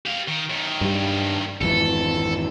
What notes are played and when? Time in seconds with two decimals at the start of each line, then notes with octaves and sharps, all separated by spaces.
0.06 G4 F5
0.28 D#3
0.50 F#2 D#3
0.81 G2 G3
1.61 G#1 F2 E3 A4